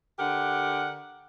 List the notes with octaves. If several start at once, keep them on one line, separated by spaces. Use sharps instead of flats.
D3 G4 A#4 F#5